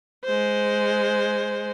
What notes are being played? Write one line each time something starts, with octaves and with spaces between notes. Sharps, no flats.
G#3 C5